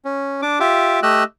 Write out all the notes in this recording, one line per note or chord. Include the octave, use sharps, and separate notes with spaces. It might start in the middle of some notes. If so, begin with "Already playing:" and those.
C#4
D4 D6
F4 G4 E5 D6
A3 G4 D#5 E6 F#6